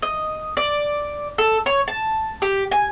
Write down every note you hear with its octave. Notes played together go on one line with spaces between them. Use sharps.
D#5
D5
A4
C#5
A5
G4
G#5